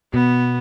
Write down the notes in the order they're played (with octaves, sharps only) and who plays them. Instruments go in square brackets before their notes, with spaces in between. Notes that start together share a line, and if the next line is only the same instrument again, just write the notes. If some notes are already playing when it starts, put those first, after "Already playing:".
[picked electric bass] B2 [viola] B3